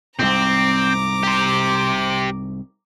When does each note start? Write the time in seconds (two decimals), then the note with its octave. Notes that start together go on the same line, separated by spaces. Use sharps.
0.19 C2 G#2 C4 A#5 D6
1.23 G4 C5